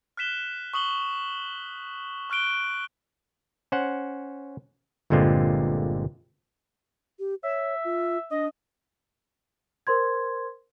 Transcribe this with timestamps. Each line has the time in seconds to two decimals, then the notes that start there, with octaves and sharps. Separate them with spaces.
0.17 F6 F#6 B6 E7 G7
0.74 C#6 D#6 F#7 G7
2.30 C#6 F6 F#6 D7 G7
3.72 C#4 C5 F#5
5.10 G1 A#2 D3 G#3 C4 F4
7.19 G4
7.43 C#5 E5
7.85 F4
8.31 D4 D#5
9.87 A#4 C5 C6 G#6